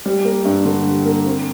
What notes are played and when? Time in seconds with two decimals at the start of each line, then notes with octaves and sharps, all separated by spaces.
0.06 G3
0.25 A#3
0.45 G2
0.65 D3
0.86 G3
1.06 A#3
1.26 C4